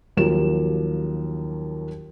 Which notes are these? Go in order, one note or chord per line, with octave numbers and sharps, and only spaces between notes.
D#2 F3 F#3 G4 A#4 E7